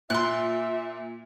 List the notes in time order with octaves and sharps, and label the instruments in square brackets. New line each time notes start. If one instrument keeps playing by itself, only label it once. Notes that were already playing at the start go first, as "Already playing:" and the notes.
[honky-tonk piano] A#2 [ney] F4 [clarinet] E5 [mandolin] C6 F#6